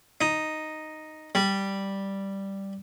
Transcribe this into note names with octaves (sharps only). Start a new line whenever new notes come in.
D#4
G3